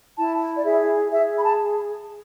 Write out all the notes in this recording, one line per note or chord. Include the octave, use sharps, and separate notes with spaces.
E4 A5
D5
G#4 E5
G#4 E5
B5
A5